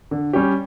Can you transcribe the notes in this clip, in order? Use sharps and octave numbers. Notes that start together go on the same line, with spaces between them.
D3
G3 C#4 G4